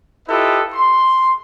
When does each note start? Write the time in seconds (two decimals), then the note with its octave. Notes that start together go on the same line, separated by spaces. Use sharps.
0.29 E4 F4 G4 A4 B4 D#5
0.74 C6